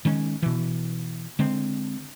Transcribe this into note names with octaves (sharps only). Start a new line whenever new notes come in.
D#3 G#3 C#4
B2 E3
D3 G#3 C4